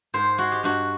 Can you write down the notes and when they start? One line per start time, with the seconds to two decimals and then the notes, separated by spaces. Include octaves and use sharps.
0.14 G#2 C5
0.38 G#3 F#4
0.52 G4
0.63 G2 F#4